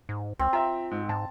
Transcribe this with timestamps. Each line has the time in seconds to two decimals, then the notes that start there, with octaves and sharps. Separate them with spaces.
0.09 G#2
0.39 C#2 C4
0.53 F4 E5 G5 A#5
0.91 G#2
1.09 G#2 A5